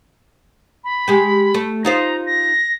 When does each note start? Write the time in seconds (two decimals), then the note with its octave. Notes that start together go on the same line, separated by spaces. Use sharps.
0.84 B5
1.08 G#3 G4
1.54 A3
1.85 D#4 F4 C5 A#5
2.26 A#6